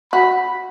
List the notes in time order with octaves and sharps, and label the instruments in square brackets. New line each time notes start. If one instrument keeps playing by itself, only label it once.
[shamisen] F#4 [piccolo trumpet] B5